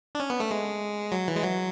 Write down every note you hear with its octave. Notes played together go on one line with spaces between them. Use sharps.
D4
C#4
B3
A3
G#3
F#3
E3
G#3
F#3